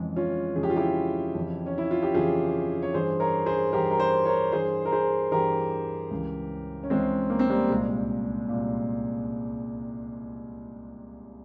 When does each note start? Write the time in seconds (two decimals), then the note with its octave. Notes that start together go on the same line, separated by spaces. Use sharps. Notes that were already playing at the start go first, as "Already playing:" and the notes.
Already playing: F2 C#3 E3 G#3
0.16 C#4 F4
0.55 F2 C#3 E3 G#4
0.63 G4
0.70 F4
0.76 E4 G4
1.35 F2 C#3 E3
1.66 C#4
1.78 E4
1.91 F4
2.02 G4
2.14 F2 C#3 E3 F4 G#4
2.82 C#5
2.93 G2 E3 G#4 C5
3.20 A#4 C#5
3.46 G#4 C5
3.73 G2 E3 G4 A#4
3.91 A#4
3.99 G#4 C5
4.25 A#4 C#5
4.52 G2 E3 G#4 C5
4.85 A#4
4.92 G#4 C5
5.32 G2 E3 G4 A#4
6.11 C#2 C#3 E3
6.83 C#4
6.90 C#2 C#3 E3 G#3 C4
7.30 A#3
7.39 C4
7.49 G3 A#3
7.70 C2 A#2 G#3
8.49 C2 A#2